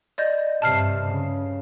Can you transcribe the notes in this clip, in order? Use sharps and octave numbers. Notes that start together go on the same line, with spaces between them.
D5 D#5 G6
G2 C3 A5 F6 C7
C#3